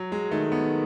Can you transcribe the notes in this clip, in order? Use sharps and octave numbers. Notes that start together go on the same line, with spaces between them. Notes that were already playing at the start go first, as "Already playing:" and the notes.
Already playing: F#3
G#3
D#3 A3
B3